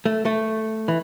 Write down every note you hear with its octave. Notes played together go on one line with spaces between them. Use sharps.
A3
A3
E3